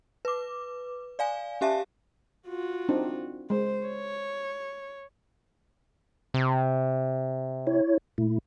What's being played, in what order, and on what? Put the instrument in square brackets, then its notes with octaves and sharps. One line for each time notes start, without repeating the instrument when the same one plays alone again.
[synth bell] B4 D6
D5 F5 G#5
C#4 G4 E5 F5 A5
[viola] F4 F#4
[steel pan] C4 D4 D#4
[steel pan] G#3 [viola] C5
[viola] C#5
[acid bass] C3
[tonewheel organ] E4 C#5
A#2 A3 E4